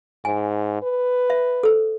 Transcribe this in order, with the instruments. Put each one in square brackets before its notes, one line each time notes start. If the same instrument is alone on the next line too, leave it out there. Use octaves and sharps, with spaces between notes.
[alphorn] G#2 [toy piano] G#5
[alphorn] B4
[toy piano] E5
A4 C5